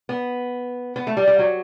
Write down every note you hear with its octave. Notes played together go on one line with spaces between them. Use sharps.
B3
B3
A3
G3
G3
F#3